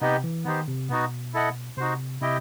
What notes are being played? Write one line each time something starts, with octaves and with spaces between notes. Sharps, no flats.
C3 B3 D#4 G4 D#5
E3
D#3 B3 D#4 G4 C5
C3
B2 B3 D#4 F#4
E4 A4 D#5 F#5
C3 D#4 F#4 C5
C3 E4 G4 D#5 G5